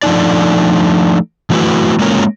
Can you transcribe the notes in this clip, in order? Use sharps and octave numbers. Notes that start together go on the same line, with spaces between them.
F3 A3 B3 D4 D#4 D5
E3 F#3 A3 E4 F#4 B4
G#3 A#3 C#4 F4 A#4 C#5